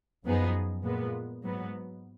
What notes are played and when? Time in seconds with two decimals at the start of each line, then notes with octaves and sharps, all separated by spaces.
0.25 F#2 F3 B3 D#4 G#4
0.84 A#2 G#3 B3
1.43 G#2 F#3 B3